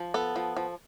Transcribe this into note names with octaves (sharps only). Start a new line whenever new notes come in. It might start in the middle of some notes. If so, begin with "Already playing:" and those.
Already playing: F3
B3 A4
F3
F3